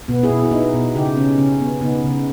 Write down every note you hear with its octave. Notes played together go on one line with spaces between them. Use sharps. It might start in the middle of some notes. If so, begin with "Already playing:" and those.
B2 B3
E4 G#4
B2
E4
B3 D#4
B2
C#3 D#4 G4
C#3 C#4
C#3 C#4
B3
C#3 B3 D#4
C#3